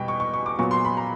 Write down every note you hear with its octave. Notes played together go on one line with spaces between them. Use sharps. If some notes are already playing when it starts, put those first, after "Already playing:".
Already playing: E2 B2 G3 B3 G5
C#6
C#6
C#6
D6
A#2 F#3 B3 C#6
C6
B5
A#5